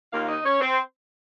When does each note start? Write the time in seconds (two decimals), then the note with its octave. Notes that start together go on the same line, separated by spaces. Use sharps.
0.12 D#2 D#3 A#3 F4 F5
0.29 D#4 D#5
0.45 C#4 C#5
0.60 C4 C5